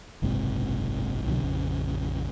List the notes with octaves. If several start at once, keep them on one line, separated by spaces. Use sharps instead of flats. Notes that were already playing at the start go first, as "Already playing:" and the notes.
F#1 B1 G#2 C3
C2 B2 D3 F#3
A#1 F2 C#3